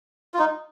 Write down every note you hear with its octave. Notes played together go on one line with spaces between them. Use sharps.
F4
D#4